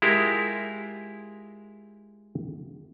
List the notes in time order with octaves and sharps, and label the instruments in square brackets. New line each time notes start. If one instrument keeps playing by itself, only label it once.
[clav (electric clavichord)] G#3 E4 F4 G4 A#4